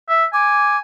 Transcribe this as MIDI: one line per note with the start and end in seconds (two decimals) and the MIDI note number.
0.09 0.25 76
0.33 0.79 80
0.33 0.76 86